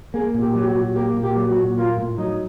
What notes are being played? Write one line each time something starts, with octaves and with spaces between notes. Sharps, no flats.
A#3 G#4
A#2
G4
F#3
G4
F#4
A#2
A#3 G4
A#2
G4
F#3
F#4
A#2
A#3 F4
A2
F#3 D#4